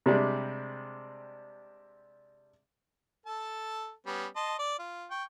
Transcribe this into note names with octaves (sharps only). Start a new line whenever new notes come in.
C3 G3 G#3 D4
A4 A5
G3 B3 C#4
D#5 A5 C6
D5
F4
G5 C#6